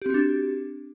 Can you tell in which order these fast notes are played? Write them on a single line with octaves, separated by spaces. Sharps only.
G4 C4 F#4 D4